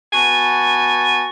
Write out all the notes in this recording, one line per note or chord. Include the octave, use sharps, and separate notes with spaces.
B3 F#4 G#5 A5